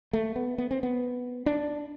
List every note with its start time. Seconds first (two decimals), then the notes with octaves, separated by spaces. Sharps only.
0.13 A3
0.36 B3
0.58 B3
0.71 C4
0.83 B3
1.46 D4